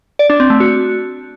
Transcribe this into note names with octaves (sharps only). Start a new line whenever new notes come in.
D5
D4
C4
A3
F#4